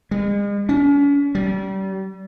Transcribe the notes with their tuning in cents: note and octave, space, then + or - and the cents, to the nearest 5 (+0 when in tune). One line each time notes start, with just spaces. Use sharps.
G#3 -40
C#4 +40
G3 -30